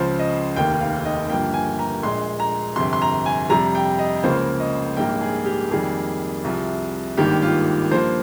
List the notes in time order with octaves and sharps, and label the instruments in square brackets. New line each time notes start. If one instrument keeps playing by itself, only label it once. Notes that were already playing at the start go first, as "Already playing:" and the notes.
Already playing: [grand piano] C#2 C#3 F3 C5
D#5
F1 D#2 D#3 A#3 G5
F5
D#5
G1 G2 F3 A#3 G5
G#5
A#5
A#1 A#2 G#3 C6
A#5
G1 F2 C3 C6
C6
A#5
G#5
F2 C3 G3 A#5
G5
D#5
C#2 C#3 F3 A#3 C5
D#5
A#1 G#2 G3 A#3 G5
G#4
G4
F2 D#3 G3 A#3 G#4
C2 C3 F3
G#1 G2 D#3 A#3 G4
F4
G2 F3 A#3 C5